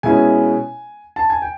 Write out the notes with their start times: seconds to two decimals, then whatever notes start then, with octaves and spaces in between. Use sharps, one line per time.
0.03 B2 G#3 C#4 E4 G#5
1.16 A5
1.30 G#5
1.42 G5